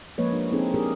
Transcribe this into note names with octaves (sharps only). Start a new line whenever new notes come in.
F3 G#3 A#3 B4 C#5 D#5
D4 G4
C4 D#4 E4 G#4 A4
D4 G4 G#4 A#4